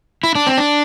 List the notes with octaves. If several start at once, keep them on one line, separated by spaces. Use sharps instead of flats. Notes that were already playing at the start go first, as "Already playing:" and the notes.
E4
D4
C4
D4